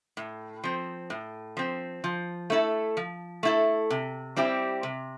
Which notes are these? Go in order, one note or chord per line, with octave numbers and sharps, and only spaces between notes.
A2
F3 C4
A2
F3 C4
F3
A3 E4 A4
F3
A3 E4 A4
C3
G3 C4 E4 G4
C3